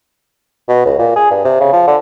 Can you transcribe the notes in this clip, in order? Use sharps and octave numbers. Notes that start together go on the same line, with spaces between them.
B2
C#2
A#2
G#4
G2
C3
C#3
F3
D3